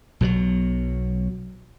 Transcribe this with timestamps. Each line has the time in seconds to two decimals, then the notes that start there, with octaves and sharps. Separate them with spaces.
0.21 B1 B2 D#3 F#3